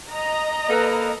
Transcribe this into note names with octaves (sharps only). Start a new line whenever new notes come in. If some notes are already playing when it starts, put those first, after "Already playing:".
D#5 A#5
A#3 A4 B4